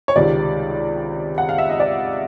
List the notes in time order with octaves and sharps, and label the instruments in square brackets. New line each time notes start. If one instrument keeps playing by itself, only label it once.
[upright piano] C#5
C#2 C3 D#3 D5
F#5
F5
E5
D#5
D5